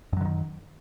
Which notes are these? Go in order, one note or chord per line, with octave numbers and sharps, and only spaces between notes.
F#2 D3 D#3 F#3